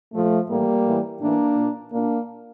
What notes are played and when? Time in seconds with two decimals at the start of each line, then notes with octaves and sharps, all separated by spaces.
0.14 A#2 F3 A3
0.49 A2 E3 G3 A#3
0.86 A2 E3
1.21 A2 E3 A#3 D4
1.57 A#2
1.92 A#2 A#3 D4